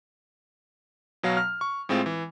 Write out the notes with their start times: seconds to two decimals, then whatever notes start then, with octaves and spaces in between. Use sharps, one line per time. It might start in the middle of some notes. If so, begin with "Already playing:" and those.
1.23 B2 F#3 F5
1.37 F6
1.61 C#6
1.89 A2 G#3 C4 F4
2.06 E3